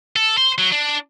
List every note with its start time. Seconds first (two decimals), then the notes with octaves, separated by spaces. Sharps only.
0.16 A4
0.38 C5
0.58 F#3
0.72 D4